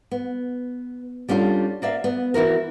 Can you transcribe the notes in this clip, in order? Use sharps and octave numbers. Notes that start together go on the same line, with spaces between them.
B3
G3 C#4 D4 F4 A4
A#3 D5 E5 F5
B3
E3 E4 F#4 A#4